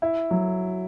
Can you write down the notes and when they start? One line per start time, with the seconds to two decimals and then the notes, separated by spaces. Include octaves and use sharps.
0.02 E4
0.31 F#3